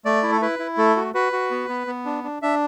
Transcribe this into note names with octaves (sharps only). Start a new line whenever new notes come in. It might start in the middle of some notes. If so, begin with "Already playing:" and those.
A3 D5
E4
A4
E4 B4
E4
A3 A4
F#4
F#4 B4
F#4
B3
B3
B3
D4
D4
D4 E5